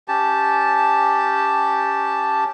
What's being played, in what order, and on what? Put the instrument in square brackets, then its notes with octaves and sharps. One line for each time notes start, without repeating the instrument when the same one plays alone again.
[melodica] C#4 G4 A5